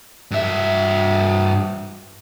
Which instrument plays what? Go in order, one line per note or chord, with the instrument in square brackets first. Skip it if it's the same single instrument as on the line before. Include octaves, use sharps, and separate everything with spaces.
[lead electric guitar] G2 E5